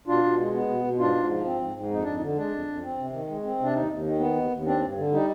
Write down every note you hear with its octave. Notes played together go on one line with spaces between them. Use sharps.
B2 D4 F4
B2
G#3
B3
B2
B2
G#2 D4 F4
G#2
F3
C4
G#2
G#2
F2 D#4
F2 D4
D#4
D3
G#3 D4
F2
F2
C4
C3
D#3
G#3
C4
C3 D4
D#2 D#4
D#2
D#3
B3
D#2
D#2
C4 D4
G2
D3
G3 D#4